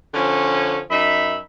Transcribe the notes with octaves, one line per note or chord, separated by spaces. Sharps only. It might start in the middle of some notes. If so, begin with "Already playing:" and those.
D3 F3 C#4
F#2 D#4 E5 B5